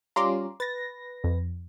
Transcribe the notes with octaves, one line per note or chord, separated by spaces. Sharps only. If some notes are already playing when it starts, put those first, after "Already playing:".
G3 C#4 F4 A#5 C6 D6
B4 A6 A#6
F2